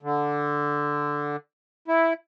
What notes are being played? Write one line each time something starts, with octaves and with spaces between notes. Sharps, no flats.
D3
E4